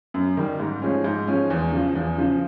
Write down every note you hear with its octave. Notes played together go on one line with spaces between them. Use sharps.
F#2
D#3 G3
G#2
F3 G#3 C#4
G#2
F3 G#3 C#4
E2
C#3 F3
E2
C#3 F3